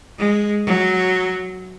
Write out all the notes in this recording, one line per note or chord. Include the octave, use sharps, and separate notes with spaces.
G#3
F#3